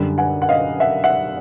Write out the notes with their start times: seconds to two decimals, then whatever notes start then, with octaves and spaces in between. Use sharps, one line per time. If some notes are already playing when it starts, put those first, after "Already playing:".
Already playing: F#2 D3 G3
0.18 F#5 G#5
0.42 F#5
0.49 D#5 F5
0.80 E5 F#5
1.04 E5 F#5